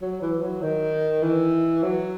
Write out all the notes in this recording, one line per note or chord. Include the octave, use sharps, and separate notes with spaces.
F#3
E3
F#3
D#3
E3
F#3